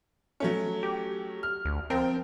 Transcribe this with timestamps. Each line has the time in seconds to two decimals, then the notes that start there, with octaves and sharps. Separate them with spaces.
0.40 F#3 A3 C#4
0.83 G4
1.43 F6
1.65 D2
1.90 F3 C4 A#4 G5